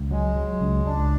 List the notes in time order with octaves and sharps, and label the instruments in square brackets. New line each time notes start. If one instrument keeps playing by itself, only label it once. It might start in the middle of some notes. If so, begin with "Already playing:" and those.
Already playing: [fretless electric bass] C#2
[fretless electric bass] F#3 [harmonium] G#3
[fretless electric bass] F#3
C#2
[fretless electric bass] C#2 [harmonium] D4